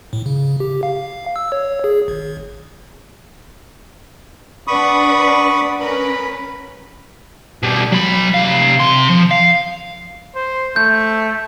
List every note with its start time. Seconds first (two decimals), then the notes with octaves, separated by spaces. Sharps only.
0.13 A2
0.26 C#3
0.60 G4
0.83 F5
1.36 E6
1.52 C#5
1.84 G#4
2.08 G#1
4.67 D4 B4 D5 F#5 B5 C#6 D#6
5.80 C#4 A#4 B4 B5
7.63 B2 G3
7.92 F#3 B5
8.34 C3 F5
8.80 C3 C6
9.10 F3
9.31 F5
10.35 C5
10.76 A3 G6